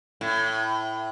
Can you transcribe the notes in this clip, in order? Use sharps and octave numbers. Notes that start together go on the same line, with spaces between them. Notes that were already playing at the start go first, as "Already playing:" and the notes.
A2